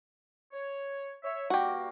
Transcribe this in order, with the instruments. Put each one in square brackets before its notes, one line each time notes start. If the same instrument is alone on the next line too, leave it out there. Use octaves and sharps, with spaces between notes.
[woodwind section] C#5
C#5 E5
[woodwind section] G2 A#3 [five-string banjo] F#4 G4